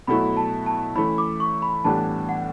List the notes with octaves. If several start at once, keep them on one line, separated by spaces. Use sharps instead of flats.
B2 F#3 A3 E4 B5
A5
A5
E3 A3 C#4 E4 B5
D6
C#6
B5
A2 E3 G3 B3 D4 A5
F#5